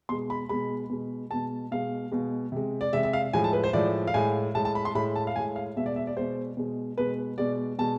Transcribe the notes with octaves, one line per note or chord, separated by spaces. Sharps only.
B2 G#3 C6
B5
B2 G#3 B5
B2 G#3
B2 G#3 A5
B2 G#3 F5
B2 G#3
C3 G#3
D5
C3 G#3 E5
E5
F5
A2 F3 G#3 G#5
A5
B4
C5
A2 F3 G#3 D5
F5
A2 G#3 G#5
A2 G#3 A5
A5
B5
C6
A2 G#3 B5
A5
F5
A2 G#3 G#5
F5
B2 G#3 E5
D5
E5
D5
B2 G#3 C5
B2 G#3
B2 G#3 B4
B2 G#3 D5
B2 G#3 A5